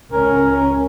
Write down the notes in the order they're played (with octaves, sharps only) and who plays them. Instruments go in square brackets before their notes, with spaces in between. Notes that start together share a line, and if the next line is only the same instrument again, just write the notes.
[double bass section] C#2 C#4 [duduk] A#4